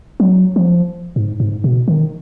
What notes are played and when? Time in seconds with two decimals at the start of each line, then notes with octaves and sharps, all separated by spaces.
0.20 F#3
0.56 F3
1.16 G#2
1.40 G#2
1.64 B2
1.88 D#3